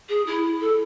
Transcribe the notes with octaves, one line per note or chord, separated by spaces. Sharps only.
G#4
E4
A4